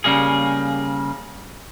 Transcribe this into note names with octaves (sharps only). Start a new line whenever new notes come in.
C#3 G3 A#3 G#4